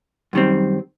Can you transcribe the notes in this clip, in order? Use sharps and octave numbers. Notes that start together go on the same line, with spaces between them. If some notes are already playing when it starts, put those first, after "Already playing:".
F#2 D#3 G3 C4